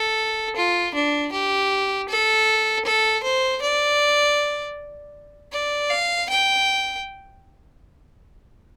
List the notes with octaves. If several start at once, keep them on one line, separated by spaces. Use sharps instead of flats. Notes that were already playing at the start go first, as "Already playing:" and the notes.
Already playing: A4
F4
D4
G4
A4
A4
C5
D5
D5
F5
G5